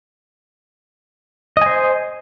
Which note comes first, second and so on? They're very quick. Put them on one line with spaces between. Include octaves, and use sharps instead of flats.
D#5 G#5 C5